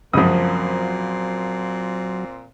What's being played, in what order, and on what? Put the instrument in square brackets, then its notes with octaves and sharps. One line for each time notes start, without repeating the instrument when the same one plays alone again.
[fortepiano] C#2 F#2 [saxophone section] A#2 A#3 C4 [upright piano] F3 D#6 [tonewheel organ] F#3